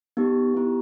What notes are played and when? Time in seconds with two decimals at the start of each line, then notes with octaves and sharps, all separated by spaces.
0.17 B3 D#4 G4
0.54 B3 E4 G4